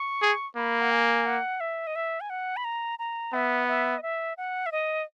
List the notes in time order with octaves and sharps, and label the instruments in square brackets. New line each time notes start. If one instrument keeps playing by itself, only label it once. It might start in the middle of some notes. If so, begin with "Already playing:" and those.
Already playing: [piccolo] C#6
[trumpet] G#4
[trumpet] A#3 [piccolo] B5
[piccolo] F#5
G#5
F#5
E5
D#5
E5
G#5
F#5
B5
A#5
A#5
[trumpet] B3 [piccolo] E5
[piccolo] E5
D#5
E5
F#5
E5
D#5